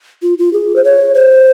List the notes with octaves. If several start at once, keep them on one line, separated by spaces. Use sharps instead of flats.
F4
F4
G#4
C5
C#5
C5